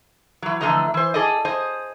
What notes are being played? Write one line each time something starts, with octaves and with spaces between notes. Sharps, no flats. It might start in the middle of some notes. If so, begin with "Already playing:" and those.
E3 F#3
D3 E3 F3 A3 D#5 A#5
E3 C5
G#4 A4 D5 D#5
G#4 C5 D#5